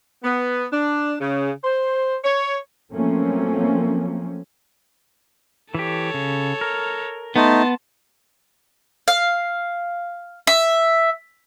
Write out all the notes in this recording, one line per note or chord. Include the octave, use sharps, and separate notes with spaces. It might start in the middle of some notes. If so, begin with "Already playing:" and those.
B3
D4
C#3
C5
C#5
F3 F#3 A3 A#3 C4 C#4
E3 G4 A4 C#5
C#3
A#4
A3 B3 D#4 A5 C6
F5
E5